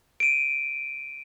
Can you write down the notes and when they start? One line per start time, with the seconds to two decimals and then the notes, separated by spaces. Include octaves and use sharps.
0.20 D7 D#7